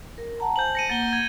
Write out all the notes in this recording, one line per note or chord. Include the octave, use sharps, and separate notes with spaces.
A#4
F#5 A5 A#5
C5 G#5 A5 G6 F#7
A#6 C#7 D#7
A#3 F#5 A6 G7
G#6